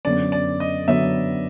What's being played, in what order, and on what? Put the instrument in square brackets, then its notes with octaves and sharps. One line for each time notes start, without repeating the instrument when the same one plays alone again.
[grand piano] F#2 D3 F#3 B3 [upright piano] D5
[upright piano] D5
D#5
[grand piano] D3 F#3 B3 [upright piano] E5